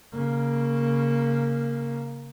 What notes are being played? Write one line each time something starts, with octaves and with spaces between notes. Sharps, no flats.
C#3 A#3